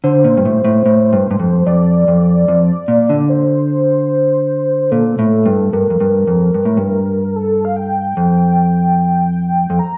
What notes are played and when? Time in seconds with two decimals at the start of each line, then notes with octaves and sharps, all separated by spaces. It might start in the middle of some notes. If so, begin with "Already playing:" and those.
0.04 D3 C5
0.24 A#2
0.37 G2
0.45 A2
0.65 A2
0.86 A2
1.13 G2
1.31 G2
1.40 F2
1.67 F2 D5
2.08 F2
2.48 F2
2.88 A#2
3.10 D3
3.30 C5
4.91 A#2 A4
5.19 A2
5.46 G2
5.73 G2 A#4
5.90 F2
6.00 G2
6.28 F2
6.54 G2
6.65 A2
6.77 G2
7.36 A4
7.65 F5
7.76 G5
8.17 F2
9.70 F2
9.79 A#5